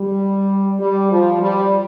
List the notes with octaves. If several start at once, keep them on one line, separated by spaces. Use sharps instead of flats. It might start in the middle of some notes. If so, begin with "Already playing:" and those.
Already playing: G3
G3
F3
G3